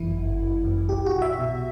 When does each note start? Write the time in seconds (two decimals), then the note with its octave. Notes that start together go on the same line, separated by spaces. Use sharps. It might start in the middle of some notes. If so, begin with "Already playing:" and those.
Already playing: G1 F#2 E3 E4
0.16 G1
0.41 G1
0.64 F#2
0.89 B1 G4
1.06 F#4
1.14 B1
1.22 E5
1.39 B2